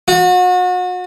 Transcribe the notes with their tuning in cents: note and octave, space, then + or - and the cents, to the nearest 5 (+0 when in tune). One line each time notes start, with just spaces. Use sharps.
F#4 -35